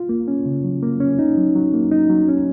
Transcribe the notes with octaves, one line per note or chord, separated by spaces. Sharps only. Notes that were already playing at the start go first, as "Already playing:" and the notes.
Already playing: F4
A#3
C#4
C#3
F#3
A#3
C#4
D#4
F#3
F#3
A#3
D#4
F#3
C#4